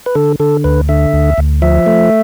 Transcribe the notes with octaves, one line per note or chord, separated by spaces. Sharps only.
B4
D3 A4
D3 A4
D2 B4
D3 E5
D2
D2
F3 E5
A3